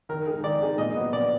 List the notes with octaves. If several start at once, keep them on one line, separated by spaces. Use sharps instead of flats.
D#3 A#4
G#3 D#4 G#4
D#3 D5
G#3 D#4 G#4
A#2 D#5
F#3 B3
A#2 D5